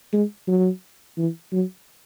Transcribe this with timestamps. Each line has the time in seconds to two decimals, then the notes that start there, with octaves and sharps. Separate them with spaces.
0.13 G#3
0.48 F#3
1.18 E3
1.53 F#3